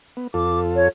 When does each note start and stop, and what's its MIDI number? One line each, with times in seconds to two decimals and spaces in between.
0.17 0.27 59
0.34 0.89 41
0.34 0.89 65
0.34 0.89 69
0.34 0.60 86
0.76 0.87 73